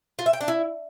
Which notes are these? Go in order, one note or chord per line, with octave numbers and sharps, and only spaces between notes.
F4
E5
G5
D4
E4